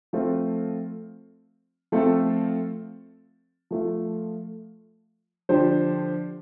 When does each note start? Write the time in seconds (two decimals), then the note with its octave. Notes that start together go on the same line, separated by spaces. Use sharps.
0.13 F3 A3 C4 F4
1.92 F3 A3 C4 F4 A4
3.71 F3 A3 F4
5.49 D3 F3 D4 G4 C5